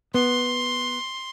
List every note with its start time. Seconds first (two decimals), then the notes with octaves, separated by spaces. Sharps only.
0.14 B3 C6